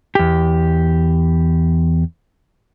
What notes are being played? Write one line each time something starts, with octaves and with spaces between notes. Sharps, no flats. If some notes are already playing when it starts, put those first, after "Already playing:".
E2 G4